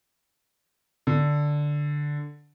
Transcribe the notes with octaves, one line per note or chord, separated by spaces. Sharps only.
D3